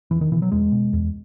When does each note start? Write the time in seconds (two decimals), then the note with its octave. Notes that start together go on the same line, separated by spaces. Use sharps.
0.11 E2 E3
0.21 D#3
0.32 B2 E3
0.42 F#3
0.52 E2 G#3
0.72 B2
0.93 E2